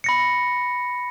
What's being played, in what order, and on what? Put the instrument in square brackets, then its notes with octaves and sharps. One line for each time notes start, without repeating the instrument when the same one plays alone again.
[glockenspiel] B5 A#6 C#7